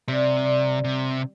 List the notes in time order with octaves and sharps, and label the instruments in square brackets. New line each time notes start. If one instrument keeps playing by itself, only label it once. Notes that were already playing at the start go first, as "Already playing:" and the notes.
[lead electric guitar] C3 [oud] G3
[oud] G3
[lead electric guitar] C3